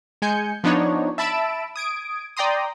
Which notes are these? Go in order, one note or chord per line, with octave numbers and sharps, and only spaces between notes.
G#3 G#5 G6 C#7
F3 B3 D4 D#4 C#5
E5 A5 B5 E6 D7 E7
D#6 G#6 D7
D5 G5 A#5 C6 D#6